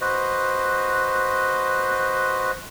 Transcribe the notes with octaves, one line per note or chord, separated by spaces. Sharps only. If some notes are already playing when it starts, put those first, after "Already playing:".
F#4 B4 C5 D#5